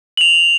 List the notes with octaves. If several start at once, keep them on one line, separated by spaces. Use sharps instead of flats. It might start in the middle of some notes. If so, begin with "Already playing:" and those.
F#7
F7